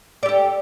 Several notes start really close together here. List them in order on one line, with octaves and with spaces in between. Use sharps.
D5 G4 A4